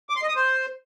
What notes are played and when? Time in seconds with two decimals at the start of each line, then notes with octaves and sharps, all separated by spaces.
0.09 D6
0.16 C6
0.22 D#5
0.29 D#6
0.36 C5